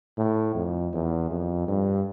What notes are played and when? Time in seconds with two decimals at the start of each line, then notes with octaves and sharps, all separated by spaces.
0.18 A2
0.55 F2
0.94 E2
1.31 F2
1.68 G2